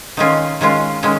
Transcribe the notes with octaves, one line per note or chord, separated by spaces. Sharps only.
D#3 G#3 C#4 F4
D#3 G#3 C#4 F4
D#3 G#3 C#4